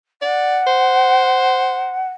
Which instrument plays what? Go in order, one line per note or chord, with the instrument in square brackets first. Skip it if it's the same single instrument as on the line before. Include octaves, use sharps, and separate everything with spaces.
[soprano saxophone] D5 [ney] F#5
[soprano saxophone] C5